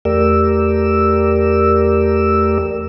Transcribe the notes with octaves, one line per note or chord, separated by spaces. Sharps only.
E2 A3 G4 A#4 D5 E6